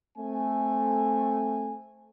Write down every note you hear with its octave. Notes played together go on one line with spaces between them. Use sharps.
A3 C4 G#5